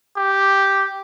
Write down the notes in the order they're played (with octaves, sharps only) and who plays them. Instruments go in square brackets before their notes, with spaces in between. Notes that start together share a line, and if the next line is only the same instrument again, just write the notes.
[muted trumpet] G4